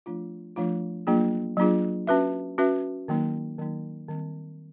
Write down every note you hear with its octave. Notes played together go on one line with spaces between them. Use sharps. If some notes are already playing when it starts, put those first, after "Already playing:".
F3 A3 D4 F4
F3 A3 D4 F4
F#3 A#3 D4 F4 G#4
F#3 A#3 D4 F4 G#4
C#4 F#4 B4 E5
C#4 F#4 B4 E5
D#3 F#3 A#3 D#4
D#3 F#3 A#3 D#4
D#3 G3 C4